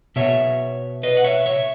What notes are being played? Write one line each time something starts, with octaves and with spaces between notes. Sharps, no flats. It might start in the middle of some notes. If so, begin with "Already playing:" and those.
B2 C#5 E5
B4 D#5
F#5
C#5 E5
C#5 E5